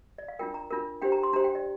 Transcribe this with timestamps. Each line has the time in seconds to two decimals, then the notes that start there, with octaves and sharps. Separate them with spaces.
0.18 D5
0.28 F5
0.39 D4 F4 A#4 G5
0.54 A#5
0.71 D4 F4 A#4
1.02 D4 G4 C5 G5
1.12 A#5
1.23 C6
1.33 D4 G4 C5 A#5
1.44 G5
1.55 D5